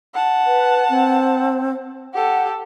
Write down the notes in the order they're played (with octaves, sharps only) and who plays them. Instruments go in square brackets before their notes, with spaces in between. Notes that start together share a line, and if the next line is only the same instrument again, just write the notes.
[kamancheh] F#5 A5
[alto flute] B4
C4
[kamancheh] G4 A4 [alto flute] F#5